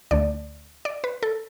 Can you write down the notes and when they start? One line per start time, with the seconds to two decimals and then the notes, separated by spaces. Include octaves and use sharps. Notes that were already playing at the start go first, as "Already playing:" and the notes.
0.11 D2 D3 A3 D5
0.85 D5
1.04 B4
1.23 A4